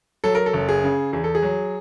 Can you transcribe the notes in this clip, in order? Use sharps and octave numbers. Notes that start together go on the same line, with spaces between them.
F#3 A4
A#4
A4
F#1
G#4
C#3
E2 G#4
A4
G#4
F#3